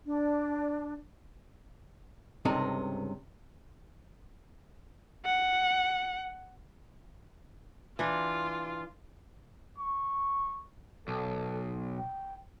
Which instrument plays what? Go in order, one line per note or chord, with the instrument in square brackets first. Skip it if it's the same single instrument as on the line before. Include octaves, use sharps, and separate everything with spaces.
[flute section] D4
[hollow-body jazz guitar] C#2 G2 C3 D#4 A4
[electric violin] F#5
[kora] E3 D4 [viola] F4
[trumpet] C#6
[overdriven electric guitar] B1 [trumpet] A4
[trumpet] G5